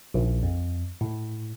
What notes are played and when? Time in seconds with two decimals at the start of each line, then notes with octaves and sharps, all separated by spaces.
0.14 A#1
0.43 F2
1.01 A2